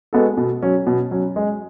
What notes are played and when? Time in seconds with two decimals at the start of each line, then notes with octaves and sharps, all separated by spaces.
0.13 G#3 B3 F#4 A4
0.37 B2
0.62 F#3 C#4
0.87 B2
1.11 F#3 C#4
1.36 G#3